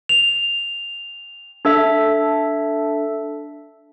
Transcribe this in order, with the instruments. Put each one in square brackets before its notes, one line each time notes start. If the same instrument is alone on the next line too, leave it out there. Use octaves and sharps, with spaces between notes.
[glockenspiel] F7
[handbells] D4 A4 E5